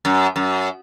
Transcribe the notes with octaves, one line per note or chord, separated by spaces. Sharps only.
F#2
F#2